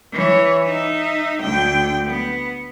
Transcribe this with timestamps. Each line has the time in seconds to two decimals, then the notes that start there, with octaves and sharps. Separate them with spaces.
0.13 E3 C#5
0.64 D#4 E5
1.41 D2 G5
2.06 B3